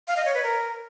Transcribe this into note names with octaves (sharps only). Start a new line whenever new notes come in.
F5
D#5
C#5
B4
A#4